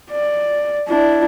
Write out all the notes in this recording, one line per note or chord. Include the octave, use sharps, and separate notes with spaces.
D5
D4 E4